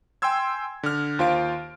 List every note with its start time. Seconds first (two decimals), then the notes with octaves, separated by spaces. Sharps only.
0.22 G5 G#5 C6 E6 G#6
0.83 D3 F6
1.19 D#2 F4 C5 F5 D7